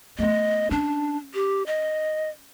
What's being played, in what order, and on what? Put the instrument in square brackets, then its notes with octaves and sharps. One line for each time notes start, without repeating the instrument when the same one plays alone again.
[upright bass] A3 B3 [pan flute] D#5
[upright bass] C#4 [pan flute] D4
[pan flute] G4
D#5